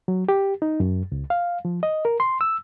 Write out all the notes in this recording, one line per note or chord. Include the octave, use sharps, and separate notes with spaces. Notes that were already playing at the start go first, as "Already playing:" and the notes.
F#3
G4
D#4
F#2
C#2
F5
F3
D#5
A#4
C6
E6